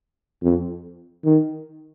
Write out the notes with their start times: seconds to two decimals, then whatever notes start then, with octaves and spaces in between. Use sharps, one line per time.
0.43 F2
1.25 D#3